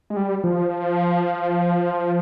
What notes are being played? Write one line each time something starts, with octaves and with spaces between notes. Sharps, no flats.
G#3
G3
F3